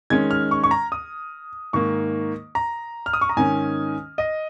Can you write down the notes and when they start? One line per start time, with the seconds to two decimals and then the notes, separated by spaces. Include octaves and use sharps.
0.10 D#3 G#3 C#4 G#6
0.31 F6
0.51 C#6
0.63 C#6
0.71 A#5
0.92 D#6
1.73 G#2 D#3 A#3 C#6
2.55 A#5
3.06 F6
3.13 D#6
3.21 C#6
3.29 A#5
3.37 G#2 D#3 C#4 G#5
4.18 D#5